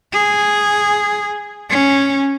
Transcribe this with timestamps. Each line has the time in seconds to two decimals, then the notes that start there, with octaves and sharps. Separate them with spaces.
0.13 G#4
1.70 C#4